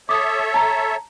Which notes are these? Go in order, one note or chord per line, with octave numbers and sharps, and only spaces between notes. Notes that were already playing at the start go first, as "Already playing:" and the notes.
A4 C#5 E5 D6 D#6
A5 A#5